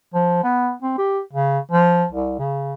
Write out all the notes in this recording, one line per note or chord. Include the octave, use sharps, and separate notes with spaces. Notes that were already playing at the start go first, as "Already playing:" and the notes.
F3
B3
C4
G4
C#3
F3
C2
C#3